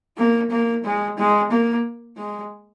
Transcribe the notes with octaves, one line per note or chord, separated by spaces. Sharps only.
A#3
A#3
G#3
G#3
A#3
G#3